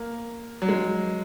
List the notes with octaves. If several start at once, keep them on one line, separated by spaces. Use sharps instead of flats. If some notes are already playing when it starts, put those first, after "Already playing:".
Already playing: A#3
F#3
G#3